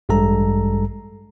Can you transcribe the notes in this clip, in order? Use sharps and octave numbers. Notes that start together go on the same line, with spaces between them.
A1 G2 G3 G#3 A4 A#5